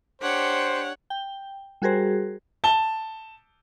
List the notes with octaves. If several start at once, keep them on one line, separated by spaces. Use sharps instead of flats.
D4 G4 C5 C#5 F#5
G5
G3 F#4 G#4 A#4 C5
A5 G7